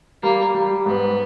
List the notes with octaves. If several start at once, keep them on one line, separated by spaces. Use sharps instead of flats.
G3 A#3
G3
G#2 B3